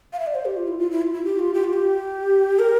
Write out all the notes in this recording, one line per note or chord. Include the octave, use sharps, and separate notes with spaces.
F5
E5
D5
C5
G4
F4
E4
F4
E4
F4
E4
G4
F4
G4
F4
G4
A#4